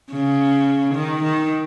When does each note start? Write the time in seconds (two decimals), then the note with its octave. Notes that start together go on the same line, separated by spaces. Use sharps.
0.11 C#3
0.95 D#3
1.24 D#3